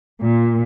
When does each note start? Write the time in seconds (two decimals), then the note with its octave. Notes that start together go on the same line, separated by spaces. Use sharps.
0.21 A#2